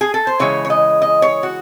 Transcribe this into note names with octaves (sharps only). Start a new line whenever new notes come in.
G#4
A4
C5
C#3 E3 G#3 C#5
C#5
D#5
D#5
C#5
F#4